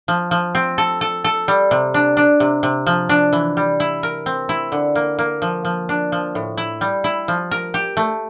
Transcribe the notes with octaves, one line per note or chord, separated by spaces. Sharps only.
F3
F3
C4
A4
A4
A4
G3
C3
D4
D4
C3
C3
F3
D4
E3
G3
E4
A#4
C4
E4
D3
A#3
A#3
F3
F3
D4
F3
A2
E4
G3
E4
F3
A#4
G4
A3